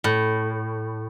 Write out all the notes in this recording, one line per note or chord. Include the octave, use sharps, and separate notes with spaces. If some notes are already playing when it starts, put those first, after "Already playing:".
A2